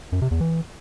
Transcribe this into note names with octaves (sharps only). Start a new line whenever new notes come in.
F#2
C3
E2
E3